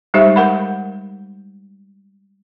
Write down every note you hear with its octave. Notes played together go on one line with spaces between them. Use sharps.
G3 G#3 D#4 G4 C5 E5
A#4 F#5 B5